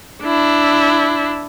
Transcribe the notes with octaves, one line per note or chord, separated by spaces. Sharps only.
D4 E4